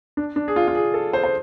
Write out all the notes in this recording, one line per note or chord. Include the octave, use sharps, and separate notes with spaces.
D4
D4
G#4
F4
F4
G#4
A4
C5
C5